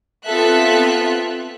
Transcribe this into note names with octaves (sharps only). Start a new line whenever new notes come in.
B3 C4 F4 A4 E5 F#6